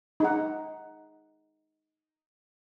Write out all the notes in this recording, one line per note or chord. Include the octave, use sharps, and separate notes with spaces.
D#4 G#4 F#5